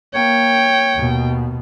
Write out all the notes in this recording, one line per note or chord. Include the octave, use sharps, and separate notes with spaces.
A#3 C#5 G5
D#2 B2